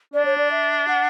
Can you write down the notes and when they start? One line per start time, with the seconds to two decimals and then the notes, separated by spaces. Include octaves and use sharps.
0.13 D4 D5
0.25 C#5
0.37 D5
0.51 E5
0.87 F#5